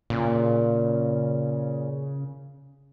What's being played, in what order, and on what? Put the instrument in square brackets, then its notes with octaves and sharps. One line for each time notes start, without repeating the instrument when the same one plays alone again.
[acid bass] A#2 [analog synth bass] C#3